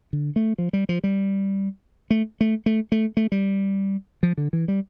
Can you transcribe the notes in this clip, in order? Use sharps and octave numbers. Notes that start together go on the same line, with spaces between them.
D3
A3
F3
G3
F3
G3
A3
A3
A3
A3
A3
G3
F3
D3
E3
G3